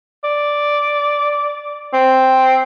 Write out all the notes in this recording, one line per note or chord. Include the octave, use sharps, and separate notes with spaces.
D5
C4